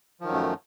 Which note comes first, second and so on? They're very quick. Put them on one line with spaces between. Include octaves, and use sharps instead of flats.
F3 D#3 F#3 F#2 A3